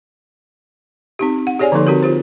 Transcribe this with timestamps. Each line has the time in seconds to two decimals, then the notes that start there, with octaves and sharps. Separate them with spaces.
1.19 C4 D#4 G4
1.47 F#5
1.59 G4 G#4 C#5 D5 G#5
1.72 D3 F3 A#3 D#4 A4 C6
1.87 C4 F#4 G4 A#4
2.03 F4 G4 C5